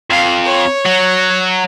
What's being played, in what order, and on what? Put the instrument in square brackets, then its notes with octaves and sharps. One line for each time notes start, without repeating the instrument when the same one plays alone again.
[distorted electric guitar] F2 [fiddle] F5
[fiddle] C#5
[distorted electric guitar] F#3